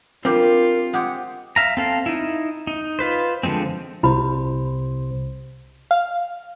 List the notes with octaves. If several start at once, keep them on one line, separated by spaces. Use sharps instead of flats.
D3 G3 C4 F4 G4 A#4
G#3 G4 F#5
E5 F5 A#5
C4 A4 F5
D#4 E4
D#4
F4 B4 C5
D3 F3 G3 G#3 C4
C2 C3 E4 C5 B5
F5